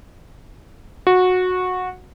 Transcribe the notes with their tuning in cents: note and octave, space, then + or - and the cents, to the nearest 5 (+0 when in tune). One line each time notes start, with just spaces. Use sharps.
F#4 -15